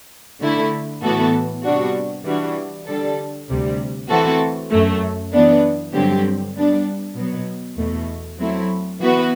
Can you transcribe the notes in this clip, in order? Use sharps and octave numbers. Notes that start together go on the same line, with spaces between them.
D3 A3 E4
A2 E3 B3 F#4 A4
C3 G3 B3 D4 F#4
E3 G3 D4 F#4
D3 G3 D4 A4
D2 C3 G3
E3 A3 C4 F#4 A4
F#2 F#3 A3
E3 B3 D4
G2 D3 F#3 C4 G4
G3 B3 D4
B2 F#3 B3
E2 B2 A3
F#3 A3 C4 E4
E3 B3 F#4 B4